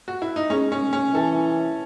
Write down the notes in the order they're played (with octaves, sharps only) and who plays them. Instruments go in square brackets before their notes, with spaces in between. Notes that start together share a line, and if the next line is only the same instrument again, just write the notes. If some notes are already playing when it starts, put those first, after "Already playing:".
[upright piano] F#4
E4
D#4
[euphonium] G#3 [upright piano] C#4
[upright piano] C#4
C#4
[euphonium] E3 [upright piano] A4